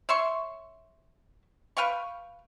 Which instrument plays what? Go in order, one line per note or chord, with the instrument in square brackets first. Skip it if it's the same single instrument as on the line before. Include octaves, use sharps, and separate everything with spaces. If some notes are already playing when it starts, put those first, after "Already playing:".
[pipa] C#5 E5 C6 C#6
B4 F5 G5 C#6